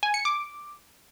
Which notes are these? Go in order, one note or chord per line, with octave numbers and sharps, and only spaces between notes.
G#5
C#7
D6